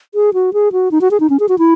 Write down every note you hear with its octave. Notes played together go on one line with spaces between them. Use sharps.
G#4
F#4
G#4
F#4
D#4
F#4
G#4
D#4
C#4
G#4
F#4
E4